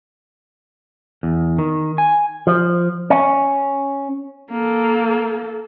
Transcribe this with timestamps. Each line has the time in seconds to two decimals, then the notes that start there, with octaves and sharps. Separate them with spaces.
1.23 E2
1.58 D#3
1.98 G#5
2.47 F3
3.10 C#4
4.51 A#3 A4